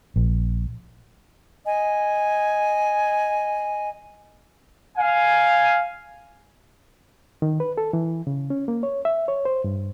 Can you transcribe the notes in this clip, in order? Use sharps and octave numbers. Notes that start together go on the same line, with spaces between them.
A#1
D#5 G#5
F5 G#5
D#3
B4
A4
E3
C#3
C#4
A#3
C#5
E5
C#5
C5
G2